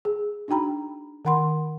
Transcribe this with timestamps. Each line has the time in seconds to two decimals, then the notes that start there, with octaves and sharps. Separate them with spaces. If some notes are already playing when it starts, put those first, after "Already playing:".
0.05 G#4
0.48 D4 D#4 F#4 G5 A#5 B5
1.25 D#3 A#4 F#5 B5 C6